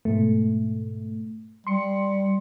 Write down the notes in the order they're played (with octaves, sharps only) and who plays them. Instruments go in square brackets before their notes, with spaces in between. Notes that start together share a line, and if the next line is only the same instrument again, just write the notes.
[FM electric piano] G#2 B2 A3
[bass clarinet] G3 [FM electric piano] C6 C#7